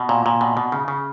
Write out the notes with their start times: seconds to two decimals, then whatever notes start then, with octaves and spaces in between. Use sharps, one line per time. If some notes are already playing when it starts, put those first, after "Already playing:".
Already playing: B2
0.09 A#2
0.26 A#2
0.41 B2
0.57 B2
0.72 C#3
0.88 C#3